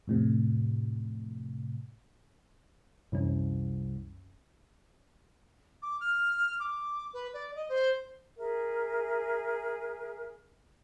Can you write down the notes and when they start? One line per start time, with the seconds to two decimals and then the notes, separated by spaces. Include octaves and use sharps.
0.07 F2 A2 C3
3.12 C2 F#2 E3 C#4
5.82 D6
6.00 F6
6.59 D6
7.13 B4
7.33 D5
7.55 D#5
7.69 C5
8.38 G#4 A#4 E5